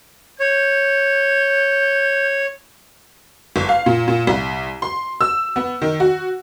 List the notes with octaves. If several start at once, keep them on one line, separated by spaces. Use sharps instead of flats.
C#5 G6
G1
F5
A#2
A#2
C2
C6
E6
B3
D#3
F#4